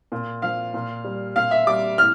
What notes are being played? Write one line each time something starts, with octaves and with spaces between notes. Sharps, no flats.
A#2
F3 F5
A#2
G3
A#2 F5
E5
G3 D6
A2 F6